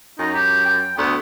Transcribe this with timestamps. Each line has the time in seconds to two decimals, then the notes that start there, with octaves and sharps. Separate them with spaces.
0.19 F#2 D#4
0.34 G4
0.65 G5
0.98 D2 B3